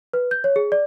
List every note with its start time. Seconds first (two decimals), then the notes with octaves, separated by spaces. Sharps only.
0.13 B4
0.31 G6
0.44 C#5
0.56 G#4
0.72 D5